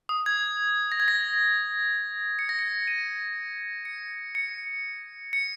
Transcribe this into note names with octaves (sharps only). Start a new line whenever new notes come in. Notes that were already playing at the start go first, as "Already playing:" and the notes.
D#6
G#6
A#6
G#6
A#6
C#7
A#6
C#7
D#7
C#7
C#7
C#7